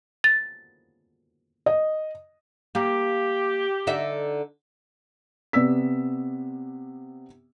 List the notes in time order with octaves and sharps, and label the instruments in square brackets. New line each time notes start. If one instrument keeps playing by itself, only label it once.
[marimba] A6
[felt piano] D#5
[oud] A#3 [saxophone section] G4
[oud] D3 D#4 E5
[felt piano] C3 B3 D5 E6 B6